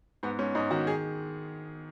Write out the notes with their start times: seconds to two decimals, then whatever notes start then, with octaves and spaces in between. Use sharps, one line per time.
0.23 G#2 B3
0.39 G#2 C#4
0.55 G#2 D#4
0.71 D#3 F#4
0.87 G#4